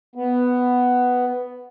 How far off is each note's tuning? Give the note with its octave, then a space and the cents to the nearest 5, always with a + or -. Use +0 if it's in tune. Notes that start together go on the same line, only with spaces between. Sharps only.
B3 +5